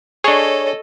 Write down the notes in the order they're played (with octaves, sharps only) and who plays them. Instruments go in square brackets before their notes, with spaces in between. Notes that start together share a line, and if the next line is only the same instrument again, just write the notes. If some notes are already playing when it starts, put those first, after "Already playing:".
[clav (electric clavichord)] D4 G#4 [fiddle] A4 D#5 [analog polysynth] C#5